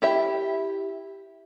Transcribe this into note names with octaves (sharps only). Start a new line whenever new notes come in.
E4 G4 E5